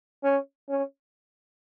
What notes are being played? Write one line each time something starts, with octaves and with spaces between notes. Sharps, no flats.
C#4
C#4